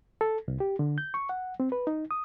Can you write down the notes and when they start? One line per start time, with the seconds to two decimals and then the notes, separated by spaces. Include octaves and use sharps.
0.21 A4
0.48 C2
0.60 G4
0.79 D3
0.98 G6
1.14 C#6
1.29 F#5
1.60 C4
1.72 B4
1.87 D#4
2.11 D#6